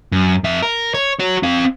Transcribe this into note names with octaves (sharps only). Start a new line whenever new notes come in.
F#2
F2 E5
A#4
C#5
F#4 C#5
C4 F5